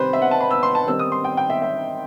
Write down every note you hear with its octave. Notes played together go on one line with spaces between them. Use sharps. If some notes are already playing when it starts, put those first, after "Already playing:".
Already playing: C3 D#3 G3 C4 B4 C5
E5
F#5
A5
B5
E6
C6
A5
D#3 G3 C4 D#4 E6
D#6
C6
G5
G5
E5
E5